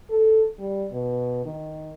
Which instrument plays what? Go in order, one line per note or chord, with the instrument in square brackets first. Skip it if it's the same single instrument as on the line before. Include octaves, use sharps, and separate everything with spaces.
[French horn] A4
G3
B2
D#3